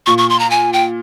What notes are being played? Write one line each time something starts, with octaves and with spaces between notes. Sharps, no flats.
A#2 C#6
C#6
C6
A#5
G#5
G5